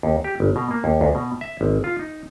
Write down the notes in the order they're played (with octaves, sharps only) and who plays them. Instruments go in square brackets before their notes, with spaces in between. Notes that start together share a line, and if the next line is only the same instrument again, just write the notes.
[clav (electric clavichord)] D#2
G4
G1
B2
A#3
D#2
D2
B2
E5
G#1
F4
D#4